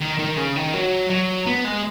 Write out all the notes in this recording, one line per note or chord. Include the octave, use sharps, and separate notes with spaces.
D#3
D#3
C#3
D#3
F#3
F#3
B3
G#3